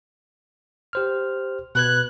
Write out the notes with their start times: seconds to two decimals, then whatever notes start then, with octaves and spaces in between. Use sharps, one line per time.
0.93 G4 C5 F6
1.75 B2 B4 F#6 G#6